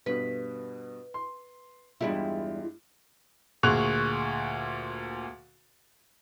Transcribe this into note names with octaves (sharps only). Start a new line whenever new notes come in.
G2 B2 B4
C6
E2 G2 G3 G#3 E4 F4
D2 A#2 G#4 C#6 F#6 F7